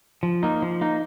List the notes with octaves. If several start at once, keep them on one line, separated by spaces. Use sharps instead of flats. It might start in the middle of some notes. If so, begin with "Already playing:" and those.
F3
A#3 D#4
F3
A#3 D#4